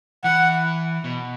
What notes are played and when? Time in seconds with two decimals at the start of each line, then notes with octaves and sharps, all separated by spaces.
0.24 E3 F#5
1.04 B2